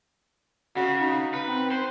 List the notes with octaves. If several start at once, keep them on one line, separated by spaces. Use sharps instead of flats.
C#3 F#4
D#4
B4
C4
C5